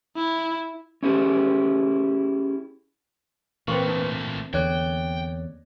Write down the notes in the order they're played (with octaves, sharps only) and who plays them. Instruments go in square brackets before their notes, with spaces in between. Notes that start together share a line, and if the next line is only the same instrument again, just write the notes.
[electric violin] E4
[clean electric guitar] C#4 E4 G4 G#4
[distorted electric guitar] A#2 A3 [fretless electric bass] E3 [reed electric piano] A#3 C4 [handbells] B4 C#6
[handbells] D4
[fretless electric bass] E2 D3 [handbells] C#5 D5 F#6 [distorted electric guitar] G5